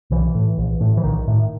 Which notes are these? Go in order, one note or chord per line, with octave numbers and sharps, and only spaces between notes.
B1 E3
A2
A#1
A2
E3
A#1 D#3
A2